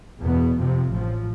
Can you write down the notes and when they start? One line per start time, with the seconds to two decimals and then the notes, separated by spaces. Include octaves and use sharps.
0.22 E2 B2 B3
0.56 F2 C3 F3
0.89 A1 A2 F3